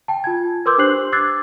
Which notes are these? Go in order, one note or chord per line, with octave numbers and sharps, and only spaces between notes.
G5 A5
F4 G#5 G#6
A#4 B4 C6 D6 E6 G6
D4 G4 C5 F#6 C7 F#7
D6 E6 F#6 G#6 A6 C7